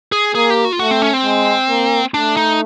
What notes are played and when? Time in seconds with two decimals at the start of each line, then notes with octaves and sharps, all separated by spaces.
0.12 G#4
0.35 A#3 G#4
0.50 G4
0.65 F#4
0.73 F4
0.79 A3 F#4
0.91 C4
1.02 C#4
1.13 C4
1.24 G#3
1.70 A#3
2.14 A3 D4
2.37 D#4